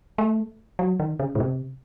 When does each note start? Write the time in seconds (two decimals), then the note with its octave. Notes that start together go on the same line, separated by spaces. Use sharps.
0.18 A3
0.79 F#3
1.00 D#3
1.20 C#3
1.35 A2
1.40 C3